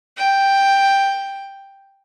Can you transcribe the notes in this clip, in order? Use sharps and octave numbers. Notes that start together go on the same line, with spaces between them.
G5